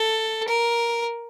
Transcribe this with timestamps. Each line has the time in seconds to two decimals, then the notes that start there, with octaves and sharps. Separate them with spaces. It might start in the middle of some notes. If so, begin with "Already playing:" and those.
Already playing: A4
0.48 A#4